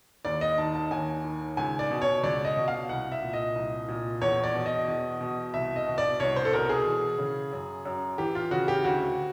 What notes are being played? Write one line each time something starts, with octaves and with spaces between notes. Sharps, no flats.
D#2 D5
D#5
D#3 A5
A5
D#2 G#5
D#3
C#2 G#5
D5
B2
C#5
C#2 D5
D#5
B2
F5
C2 F#5
E5
A#2
D#5
C2
A#2
E2 C#5
D5
B2
D#5
E2
B2
C2 E5
D#5
B2
D5
C2 C#5
C5
A4
B2 A#4
G#4
E3
C#3
F#2
F#2
E3 G4
F4
C#3 F#4
G4
D2 F#4